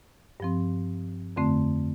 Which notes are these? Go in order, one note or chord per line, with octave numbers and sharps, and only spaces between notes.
G2 F3 C4
F2 D3 A3 C4